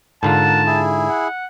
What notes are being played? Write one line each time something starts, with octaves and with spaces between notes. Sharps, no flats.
G#2 D3 F4 A#4 F#5 A5
E4 G#4
F#5